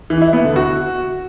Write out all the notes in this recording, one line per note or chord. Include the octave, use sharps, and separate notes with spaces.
E3
E4
B3
D3
F#4